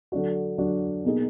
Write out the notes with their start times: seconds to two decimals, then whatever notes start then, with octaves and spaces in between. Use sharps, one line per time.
0.12 D3 F#3 D4 F#4
0.58 D3 F#3 D4 F#4
1.05 B2 A#3 D#4 G#4